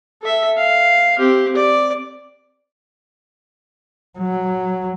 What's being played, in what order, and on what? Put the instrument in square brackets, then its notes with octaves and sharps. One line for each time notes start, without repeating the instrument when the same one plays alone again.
[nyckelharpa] A4 E5
F5
C4 G4
D5
[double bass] F#3